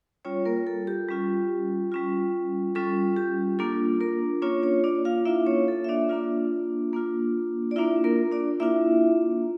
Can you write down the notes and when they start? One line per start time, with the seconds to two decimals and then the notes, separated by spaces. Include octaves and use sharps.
0.25 G3 C#4 F4 C#5
0.45 A#3 A#4
0.67 A4
0.87 G4
1.08 G3 C#4 F4
1.92 G3 C#4 F4
2.75 G3 C#4 F4 A4
3.17 G4
3.59 A#3 D4 F4 A4
4.00 A#3 A#4
4.42 A#3 C#4 D4 F4 C#5
4.63 C#4 C#5
4.84 D4 D5
5.05 F4 F5
5.25 A#3 D4 E4 F4 E5
5.47 C#4 C#5
5.68 A4
5.84 E5
5.89 D4 D5
6.09 A#3 D4 F4
6.93 A#3 D4 F4
7.71 D5
7.76 A#3 D4 E4 F4 E5
8.04 A#3 A#4
8.32 D4 D5
8.60 A#3 D4 E4 F4 E5